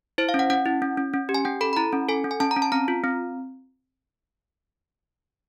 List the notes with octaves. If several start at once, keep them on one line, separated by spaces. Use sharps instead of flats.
E4 C5
F5
C#4
F#5
C#4 F#5
E4
C#4
C#4
C#4
G4
G#5
C#4 G5
A4 B5
B5
E4 A#5
C#4
A4 G#5
C#4
G#5
C#4 A5
A#5
C#4
A5
C4 A#5
F4
C4